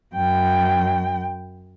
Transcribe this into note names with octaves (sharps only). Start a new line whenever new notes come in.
F#2 G5